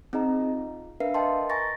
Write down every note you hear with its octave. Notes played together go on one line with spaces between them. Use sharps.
C4 D#4 G#4 D#5 A#5
F4
D4 A#4 B4 E5 F5 C7
D#5 G5 A5 C6
G#5 A#5 C#6 A6 A#6